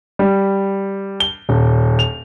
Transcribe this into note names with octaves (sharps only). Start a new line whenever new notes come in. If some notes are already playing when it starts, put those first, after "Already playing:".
G3
G7
D#1
F7